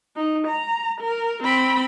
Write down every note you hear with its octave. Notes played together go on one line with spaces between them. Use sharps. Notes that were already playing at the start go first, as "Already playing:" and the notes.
D#4
A#5
A#4
C4 B5